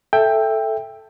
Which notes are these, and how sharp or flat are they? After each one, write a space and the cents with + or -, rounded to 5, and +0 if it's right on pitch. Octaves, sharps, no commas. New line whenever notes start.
A4 +0 E5 +0 G5 +15